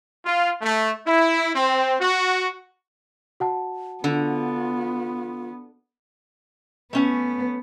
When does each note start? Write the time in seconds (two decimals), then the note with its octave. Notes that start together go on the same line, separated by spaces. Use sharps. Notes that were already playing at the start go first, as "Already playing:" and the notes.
0.24 F4
0.61 A3
1.06 E4
1.54 C4
2.00 F#4
3.40 F#4 F#5 A5
4.04 D3 B3 F4
6.93 A3 B3 C#4 G#5